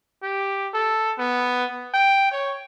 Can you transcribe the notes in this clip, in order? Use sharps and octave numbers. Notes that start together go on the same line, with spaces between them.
G4
A4
B3
G5
C#5